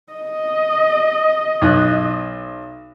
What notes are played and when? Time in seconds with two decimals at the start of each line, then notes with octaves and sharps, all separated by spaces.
0.13 D#5
1.61 B1 D#6 F#6